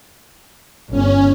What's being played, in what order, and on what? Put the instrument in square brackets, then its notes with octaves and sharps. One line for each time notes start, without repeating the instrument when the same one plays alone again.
[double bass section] G1 [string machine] C#4